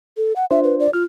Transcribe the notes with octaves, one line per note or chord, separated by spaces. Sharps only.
A4
F#5
D4 F4 C5 E5
B4
D5
F4 F6